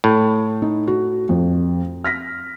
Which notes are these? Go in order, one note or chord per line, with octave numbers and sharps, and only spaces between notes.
A2
D#4
F#4
F2
F6 A#6 B6